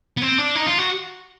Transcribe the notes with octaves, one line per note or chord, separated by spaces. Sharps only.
B3
C4
D4
D#4
F4
F#4